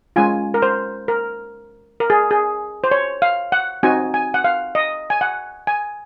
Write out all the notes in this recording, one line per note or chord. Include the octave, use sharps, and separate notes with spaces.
G#3 C#4 F4 G#5
A#4
C5
A#4
A#4
G#4
G#4
C5
C#5
F5
F#5
C4 D#4 F#4 G#5
G#5
F#5
F5
D#5
G#5
F#5
G#5